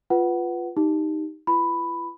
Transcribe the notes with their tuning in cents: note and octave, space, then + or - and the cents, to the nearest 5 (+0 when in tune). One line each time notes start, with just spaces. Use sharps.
F4 +0 B4 +0 F#5 +15
D#4 +0 G4 +0
F4 -45 B4 +0 B5 +5